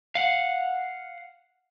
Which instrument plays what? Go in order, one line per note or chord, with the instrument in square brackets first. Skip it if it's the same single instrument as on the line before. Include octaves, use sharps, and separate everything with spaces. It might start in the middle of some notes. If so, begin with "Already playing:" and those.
[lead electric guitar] F5 F#5